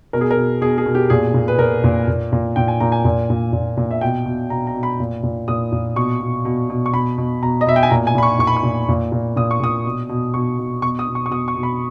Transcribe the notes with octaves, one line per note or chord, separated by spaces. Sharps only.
B2 A#4
G#4
A#4
B2
B2 G#4
G#4
B2
G4
A#2 G#4
A#2
B4
A#2 A#4
A#2
A#2
A#2
A#2 G5
G#5
A#2 A#5
G#5
A#2
A#2
A#2
A#2
E5
B2 G5
B2
B2 A#5
A#5
B2
B5
A#2
A#2
A#2 D#6
A#2
B2 C#6
B2
B2
B2
C#6
B2 B5
B2
B2 A#5
D#5
B2 E5
G5
G#5
A#2 A#5
G#5
A#2 B5
C#6
A#2 C#6
B5
C#6
A#2
A#2
A#2
A#2 D#6
C#6
A#2 D#6
B2
B2
B2 C#6
B2
B2 C#6
D#6
B2
C#6
C#6
B2 D#6
C#6
B2
B5